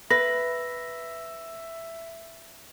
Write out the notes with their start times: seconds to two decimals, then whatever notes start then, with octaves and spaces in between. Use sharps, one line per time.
0.10 B4 E5 A#6